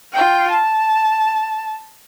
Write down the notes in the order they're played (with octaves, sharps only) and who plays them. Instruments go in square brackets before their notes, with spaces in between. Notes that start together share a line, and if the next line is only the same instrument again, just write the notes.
[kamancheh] F4 G5
A5